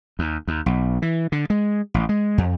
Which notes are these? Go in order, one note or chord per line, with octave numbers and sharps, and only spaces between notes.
D#2
D#2
B1
E3
D3
G#3
A1
G#3
F2